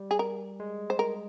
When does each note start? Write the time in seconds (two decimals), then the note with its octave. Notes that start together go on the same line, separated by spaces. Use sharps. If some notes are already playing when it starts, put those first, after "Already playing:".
Already playing: G3
0.11 G#4
0.19 A#4
0.60 G#3
0.90 C5
0.99 A#4